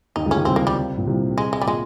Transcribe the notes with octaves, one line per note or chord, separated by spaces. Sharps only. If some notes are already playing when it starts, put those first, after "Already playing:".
D#2 D#3 D#4
C#2 C#3
D#2 D#3 C#4
C2 C3 C4
A#3
G3
A#2
C2 C3
G#3
G#3
G3
A#2 G#3